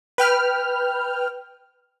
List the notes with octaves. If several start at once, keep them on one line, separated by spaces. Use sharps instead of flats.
B4 G5 F6